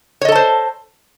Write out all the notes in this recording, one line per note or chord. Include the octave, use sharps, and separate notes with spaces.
A4 C5 C#5 D#5 A5